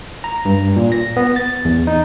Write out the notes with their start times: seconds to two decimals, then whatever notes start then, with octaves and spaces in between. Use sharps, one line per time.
0.24 A#5
0.45 G2
0.76 A#2
0.92 A#6
1.17 B3
1.36 A6
1.65 E2
1.87 D#4